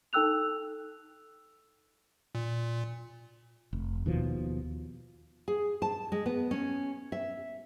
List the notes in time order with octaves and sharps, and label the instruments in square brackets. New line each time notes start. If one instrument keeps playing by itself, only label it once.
[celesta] D#4 A4 G5 E6 F#6 F7
[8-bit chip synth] A#2
[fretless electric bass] F1
D#2 B2 F3
[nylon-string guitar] G#4
A5
G#3
B3
C#4
E5